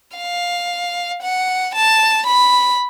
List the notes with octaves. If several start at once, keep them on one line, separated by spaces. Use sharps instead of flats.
F5
F#5
A5
B5